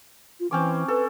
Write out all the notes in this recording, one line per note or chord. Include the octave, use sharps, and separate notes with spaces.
F4
E3 C4 C#4 D6
A4 B4